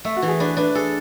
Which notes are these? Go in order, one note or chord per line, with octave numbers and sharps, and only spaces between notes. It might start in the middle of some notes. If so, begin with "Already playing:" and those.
A3 E5
F#4
E3
G#4
D4 B4
D4 B4
G#4 A4